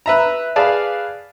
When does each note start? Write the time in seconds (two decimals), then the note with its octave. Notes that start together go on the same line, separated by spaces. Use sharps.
0.06 B4 E5 A#5
0.56 G#4 B4 D5 F5 A5